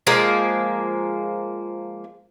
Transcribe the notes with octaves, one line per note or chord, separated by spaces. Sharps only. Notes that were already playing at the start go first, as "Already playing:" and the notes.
F3 G#3 A#3